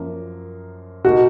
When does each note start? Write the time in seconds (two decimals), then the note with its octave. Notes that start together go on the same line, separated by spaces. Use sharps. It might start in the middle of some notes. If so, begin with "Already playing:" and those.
Already playing: F#2 F3 A#3
1.04 B2 A#3 D#4 F#4